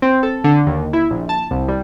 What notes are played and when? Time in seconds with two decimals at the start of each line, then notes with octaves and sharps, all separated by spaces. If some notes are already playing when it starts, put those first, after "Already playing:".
0.02 C4
0.23 A4
0.44 D3
0.66 D#2
0.93 E4
1.11 A#1
1.29 A5
1.51 C2
1.68 G3